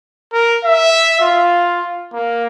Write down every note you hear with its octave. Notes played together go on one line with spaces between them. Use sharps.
A#4
E5
F4
A#3